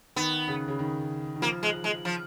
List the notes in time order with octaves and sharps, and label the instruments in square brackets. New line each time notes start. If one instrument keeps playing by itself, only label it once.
[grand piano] D#3 [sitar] B3
[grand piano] C#3
C#3
D#3
D#3
[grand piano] F3 [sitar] A#3
[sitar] G#3
G#3
F3